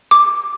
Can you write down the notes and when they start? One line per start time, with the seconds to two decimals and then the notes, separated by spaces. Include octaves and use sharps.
0.11 D6